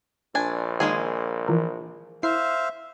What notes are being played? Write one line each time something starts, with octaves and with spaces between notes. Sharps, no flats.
A#1 D4 G#5
D#3 G#3 A#3 G#4
E3 F3 A#4
E4 C5 E5 F5 C7